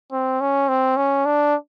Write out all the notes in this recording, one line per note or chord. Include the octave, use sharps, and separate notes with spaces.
C4
C#4
C4
C#4
D4